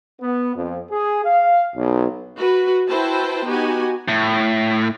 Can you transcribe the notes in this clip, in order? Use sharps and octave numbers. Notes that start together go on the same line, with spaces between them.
B3
F2
G#4
F5
B1
F#4 B4
E4 F#4 B4 C5 G5 A5
B3 D#4 F#4 G4 G#5
A2